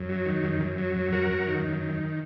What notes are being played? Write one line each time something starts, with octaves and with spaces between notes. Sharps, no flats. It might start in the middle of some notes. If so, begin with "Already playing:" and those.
Already playing: F#2
F#3
D#3
F#2
F#2
F#3
F#2
F#2 F#4 A#4
F#2
D#3
F#2
D#3